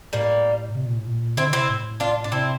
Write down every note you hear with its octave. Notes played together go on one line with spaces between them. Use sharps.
A2 G3 A#3
C3
A#2
A2
A#2
D3 C4 E4
C3 C4 E4
A2
D4 F4
D4
C3 C4 E4